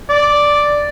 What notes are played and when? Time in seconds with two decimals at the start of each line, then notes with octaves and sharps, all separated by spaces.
0.10 D5